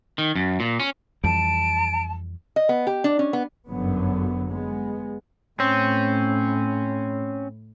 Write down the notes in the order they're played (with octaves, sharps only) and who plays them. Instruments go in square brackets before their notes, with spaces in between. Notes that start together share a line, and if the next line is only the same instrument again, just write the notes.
[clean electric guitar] D#3
F#2
A#2
C#4
[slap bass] F2 E3 G3 [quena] A5 [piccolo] D7
[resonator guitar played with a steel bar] D#5
B3
G4
D4
C#4
B3
[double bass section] G1 F#2 D3 F#3 B3
G#3 B3
[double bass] A2 [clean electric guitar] C4 [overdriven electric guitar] C#4